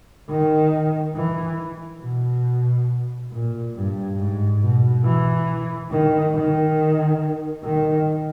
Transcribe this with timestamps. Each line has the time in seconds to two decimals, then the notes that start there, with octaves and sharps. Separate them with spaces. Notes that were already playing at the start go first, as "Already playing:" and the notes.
0.29 D#3
1.15 E3
2.02 B2
3.31 A#2
3.75 G2
4.18 G#2
4.61 B2
5.04 E3
5.91 D#3
6.34 D#3
7.63 D#3